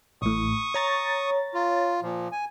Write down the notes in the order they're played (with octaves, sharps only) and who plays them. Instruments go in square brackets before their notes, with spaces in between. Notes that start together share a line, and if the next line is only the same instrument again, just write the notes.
[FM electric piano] A1 A2 [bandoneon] C#6 D#6
[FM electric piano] C#5 A#5 A6
[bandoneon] F4
A#2 F3
G#5